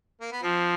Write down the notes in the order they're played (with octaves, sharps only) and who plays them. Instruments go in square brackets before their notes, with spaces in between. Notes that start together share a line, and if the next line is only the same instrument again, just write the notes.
[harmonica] A#3
B3
[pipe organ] F3 [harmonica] C4